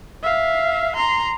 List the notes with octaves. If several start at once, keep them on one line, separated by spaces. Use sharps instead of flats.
E5 F5
A#5 C6